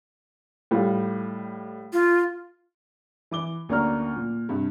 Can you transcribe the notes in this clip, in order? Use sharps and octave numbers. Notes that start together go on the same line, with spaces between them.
A2 G3 F4
F4
E3 D6 G7
D2 A#3 C#4 D5 A#5 F6
A#2
G2 C3